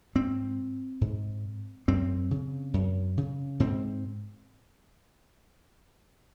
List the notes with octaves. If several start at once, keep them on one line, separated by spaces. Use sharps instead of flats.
G#2 C4
G#2
F#2 C4
C#3
F#2
C#3
G#2 C4